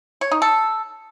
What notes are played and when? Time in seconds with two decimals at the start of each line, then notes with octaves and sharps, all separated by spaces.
0.21 C#5
0.31 D#4
0.42 A4